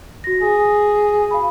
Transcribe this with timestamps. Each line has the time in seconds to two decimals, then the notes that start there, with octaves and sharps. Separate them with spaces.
0.24 F#4 A#6
0.42 G#4
1.31 F5 B5